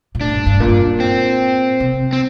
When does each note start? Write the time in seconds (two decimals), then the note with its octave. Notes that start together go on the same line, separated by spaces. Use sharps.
0.15 A#2
0.20 A2 D4
0.33 G2
0.46 G2
0.60 A#2
1.00 C4
1.80 C3
2.13 C4